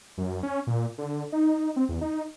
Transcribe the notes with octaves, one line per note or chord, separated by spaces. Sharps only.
F#2
C#4
A#2
D3
D#4
C4
E2
D#4